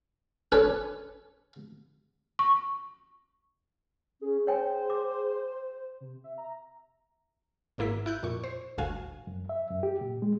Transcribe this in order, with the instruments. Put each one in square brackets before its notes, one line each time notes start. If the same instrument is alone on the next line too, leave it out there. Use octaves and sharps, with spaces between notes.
[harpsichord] C#4 D4 A4 B4 C#5
[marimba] C#6
[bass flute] C#4 [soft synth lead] G#4
[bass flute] C5 [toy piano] C#5 G5 G#5
[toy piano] D6
[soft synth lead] C3
E5
A#5
[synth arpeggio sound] G#1 G#2 A#3 E4 B6
E4 F#6 G6
F2 A#2 C#6
C5
G1 D2 A2 F#4 F5 G#5
[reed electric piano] F#2
E5
F#2
G4
A#2
G#3